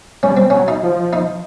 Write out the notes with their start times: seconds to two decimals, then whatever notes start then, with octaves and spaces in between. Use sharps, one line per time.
0.23 G3 C#4
0.37 C4
0.50 F#3 C#4
0.68 D#4
0.83 F3
1.13 D#4